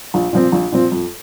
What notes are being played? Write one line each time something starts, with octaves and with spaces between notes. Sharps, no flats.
A#1
A#2 F3 C4
A#1
A#2 F3 C4
F2